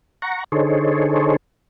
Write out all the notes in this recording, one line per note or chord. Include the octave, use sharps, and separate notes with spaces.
F#5 A#5 C#6
D3 D#4 G#4 A4 C5 C#5